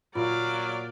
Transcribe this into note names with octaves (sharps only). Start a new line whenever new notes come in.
A#2 F#3 F4 D5 F5